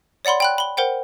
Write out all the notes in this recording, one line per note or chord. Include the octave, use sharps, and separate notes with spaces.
C#5 D5 F#5 B5 C6
G5 B5 F#6
B5 G7
A#4 C5 F#5 G5